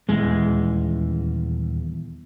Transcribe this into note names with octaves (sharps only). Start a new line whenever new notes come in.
D#1 E2 G#3